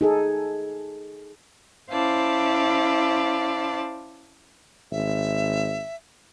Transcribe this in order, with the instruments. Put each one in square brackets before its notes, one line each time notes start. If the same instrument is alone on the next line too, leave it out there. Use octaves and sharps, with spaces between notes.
[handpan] D#4 G#4 A4
[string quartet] C#4 E4 C5 D5 F5 A5
[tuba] G#1 [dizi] E5